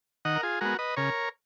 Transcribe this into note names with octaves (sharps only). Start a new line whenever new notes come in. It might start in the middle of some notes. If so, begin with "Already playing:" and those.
D#3 D#5 F#5
A#4
F4 G#4
G#3 B3 F#4 A#4
B4 D#5
C#3 A#4 C#5